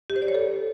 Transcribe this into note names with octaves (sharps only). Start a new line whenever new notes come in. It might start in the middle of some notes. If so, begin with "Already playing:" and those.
G4
C5
D5
C#5
A4